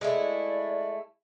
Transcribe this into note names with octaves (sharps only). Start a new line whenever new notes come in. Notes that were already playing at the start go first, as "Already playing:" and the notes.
G#3 A3 E4 D5